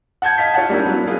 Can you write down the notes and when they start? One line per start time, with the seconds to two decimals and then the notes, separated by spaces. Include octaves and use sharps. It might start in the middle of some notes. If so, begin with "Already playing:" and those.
0.22 F#5 A5 G6 G#6
0.38 D#5 F5 A5 B6
0.54 F4 C#5 F5 F#5 A5
0.69 G3 A#3 C#4 D4 E4
0.85 F#3 B3
1.06 A#3 B3 F4 G#4